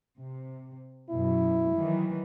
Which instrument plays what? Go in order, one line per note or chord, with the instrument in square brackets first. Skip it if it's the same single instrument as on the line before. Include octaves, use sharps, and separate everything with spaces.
[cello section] C3
[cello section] F#2 B2 [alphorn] E4
[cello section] D#3 E3 F#3